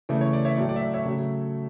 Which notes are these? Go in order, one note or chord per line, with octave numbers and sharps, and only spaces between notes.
C#3 E3 A3 D5
C#5
D5
C#5 E5
A2 F#3 A3 D5
D5
E5
D5
C#5 E5
C#3 F#3 A3